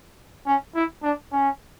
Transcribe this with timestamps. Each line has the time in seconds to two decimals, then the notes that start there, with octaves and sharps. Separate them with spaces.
0.47 C#4
0.75 E4
1.03 D4
1.31 C#4